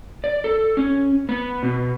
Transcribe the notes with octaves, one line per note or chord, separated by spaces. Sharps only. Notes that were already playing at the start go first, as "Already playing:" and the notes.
D5
A4
C#4
B3
B2